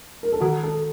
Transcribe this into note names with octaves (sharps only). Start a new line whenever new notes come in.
A#4
A4
D#3 F#4
A4